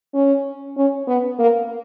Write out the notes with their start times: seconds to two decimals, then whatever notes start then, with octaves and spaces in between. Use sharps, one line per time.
0.14 C#4
0.77 C#4
1.07 B3
1.39 A#3